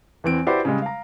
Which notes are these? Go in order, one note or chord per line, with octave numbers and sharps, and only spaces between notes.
E2 E3 C4 D7
E4 F#4 G4 B4 C5 D5
C#3 G3 G#3
F5 A#5